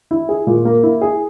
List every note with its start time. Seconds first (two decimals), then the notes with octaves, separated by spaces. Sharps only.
0.11 E4
0.29 G#4
0.47 A#2
0.65 A#3
0.83 E4
1.01 G#4